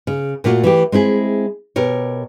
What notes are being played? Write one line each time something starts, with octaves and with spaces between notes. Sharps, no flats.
C#3
A#2 A3 A#3 F4 F#4
E3 A3 G4
G#3 C4 E4 G#4
B2 G4 A#4 C#5